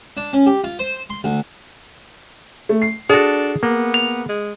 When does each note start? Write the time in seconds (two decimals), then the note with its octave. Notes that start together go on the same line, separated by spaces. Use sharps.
0.17 D4
0.33 C#4
0.46 G4
0.64 F4
0.79 C5
1.10 C6
1.24 D2
2.69 A3
2.82 C7
3.10 D4 F#4 G#4 A4
3.63 A#3 B3
3.94 F7
4.29 G#3